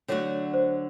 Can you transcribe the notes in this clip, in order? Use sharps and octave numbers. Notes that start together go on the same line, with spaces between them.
D3 F#3 A3 D4 F#4 C#5
C5